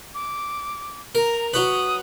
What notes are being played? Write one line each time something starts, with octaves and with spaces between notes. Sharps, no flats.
D6
A#4 A#5
F#3 F#4 B4 D#6